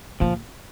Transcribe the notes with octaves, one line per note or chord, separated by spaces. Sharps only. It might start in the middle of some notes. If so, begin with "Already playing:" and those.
A#2 F3